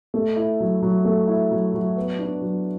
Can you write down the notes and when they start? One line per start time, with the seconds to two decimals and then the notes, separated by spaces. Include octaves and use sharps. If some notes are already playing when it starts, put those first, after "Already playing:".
0.14 A3
0.36 E4
0.60 F#3
0.82 F#3
1.05 A3
1.28 E4
1.51 F#3
1.74 F#3
1.97 B3
2.19 D4
2.42 F#3